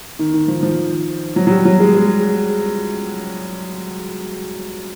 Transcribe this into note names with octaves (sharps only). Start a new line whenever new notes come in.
D#3
D#3
F3
F3
F#3
F#3
G3
F#3
G#3
G#3